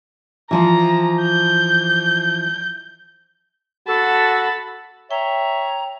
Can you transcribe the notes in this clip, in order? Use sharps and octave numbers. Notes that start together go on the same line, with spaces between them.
E3 F3 F4 A#5
G6
F#4 A4 A5 B5
C#5 E5 G5 A#5